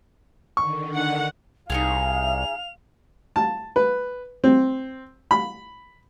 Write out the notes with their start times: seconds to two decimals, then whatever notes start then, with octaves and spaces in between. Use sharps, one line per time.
0.57 D3 D#3 C#6
0.96 F#5
1.70 C2 D#4 F4 G#4 F5 F7
3.36 A5
3.76 B4
4.44 C4
5.31 B5